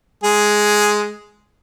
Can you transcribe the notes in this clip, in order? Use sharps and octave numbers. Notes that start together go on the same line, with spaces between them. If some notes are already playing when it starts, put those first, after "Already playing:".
G#3 G#4